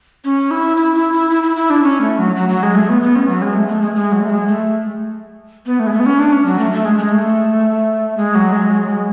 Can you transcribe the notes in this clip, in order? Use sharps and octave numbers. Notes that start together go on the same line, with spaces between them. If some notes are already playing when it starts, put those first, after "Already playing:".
C#4
E4
E4
E4
E4
E4
E4
E4
D4
C#4
A3
F#3
F#3
F#3
G#3
A3
B3
B3
C#4
F#3
G#3
A3
A3
G#3
G#3
F#3
A3
G#3
A3
B3
A3
G#3
A3
B3
C#4
D4
C#4
F#3
A3
A3
G#3
G#3
A3
G#3
F#3
G#3
F#3
G#3